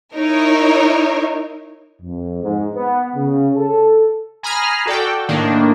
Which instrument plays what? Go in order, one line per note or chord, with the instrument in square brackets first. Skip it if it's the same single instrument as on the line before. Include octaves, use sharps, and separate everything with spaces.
[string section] D#4 E4 A#4 C#5
[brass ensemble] F2
G#2
B3
C#3
A4
[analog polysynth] G#5 A#5 B5 D#6 F6 C7
F#4 A4 D5 G5
A2 D#3 A#3 D4